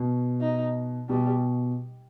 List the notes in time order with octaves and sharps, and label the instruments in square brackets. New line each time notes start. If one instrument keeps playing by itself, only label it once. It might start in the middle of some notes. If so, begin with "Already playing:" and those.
Already playing: [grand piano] B2
[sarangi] D#4
[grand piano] B2 [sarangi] G3